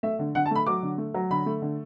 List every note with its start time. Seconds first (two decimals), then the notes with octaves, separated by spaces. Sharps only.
0.03 A3 E5
0.19 D3
0.35 D3 F#5
0.46 A5
0.51 A3 B5
0.66 F#3 D6
0.83 D3
0.98 A3
1.14 F#3
1.30 D3 B5
1.46 A3
1.62 D3